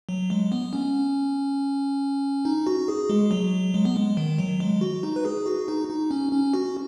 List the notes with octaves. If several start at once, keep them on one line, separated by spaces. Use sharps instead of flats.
F#3
G#3
B3
C#4
D#4
F#4
G#4
G#3
F#3
G#3
B3
G#3
D#3
F#3
G#3
F#4
D#4
B4
G#4
F#4
D#4
D#4
C#4
C#4
F#4